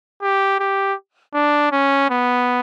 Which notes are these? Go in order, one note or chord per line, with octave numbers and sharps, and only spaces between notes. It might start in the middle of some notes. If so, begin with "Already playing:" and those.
G4
G4
D4
C#4
B3